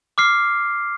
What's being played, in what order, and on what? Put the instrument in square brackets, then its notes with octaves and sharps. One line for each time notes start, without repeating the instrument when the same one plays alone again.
[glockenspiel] D6 F6 C7